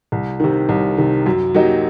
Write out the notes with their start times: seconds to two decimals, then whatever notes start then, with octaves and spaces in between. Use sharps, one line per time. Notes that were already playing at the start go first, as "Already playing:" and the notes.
0.12 C2
0.40 C3 D#3
0.69 C2
0.98 C3 D#3
1.26 F#2
1.54 F#3 A#3 D#4 G4